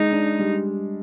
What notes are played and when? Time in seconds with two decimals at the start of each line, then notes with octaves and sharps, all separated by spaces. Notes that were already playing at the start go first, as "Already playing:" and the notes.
Already playing: G#3 D#4
0.12 D4
0.39 G3